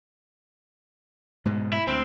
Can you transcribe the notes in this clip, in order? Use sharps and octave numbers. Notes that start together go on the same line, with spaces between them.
G#2 B2 G#3
E4
D2 C4